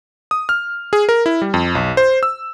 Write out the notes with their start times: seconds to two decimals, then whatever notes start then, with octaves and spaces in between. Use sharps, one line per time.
0.31 D#6
0.49 F6
0.93 G#4
1.09 A#4
1.26 E4
1.42 G3
1.54 F2
1.75 B1
1.97 C5
2.23 E6